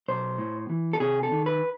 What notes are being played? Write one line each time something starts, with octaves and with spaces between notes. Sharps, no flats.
B1 C5
A2
E3
A4
C3 G#4
A4
D#3
B4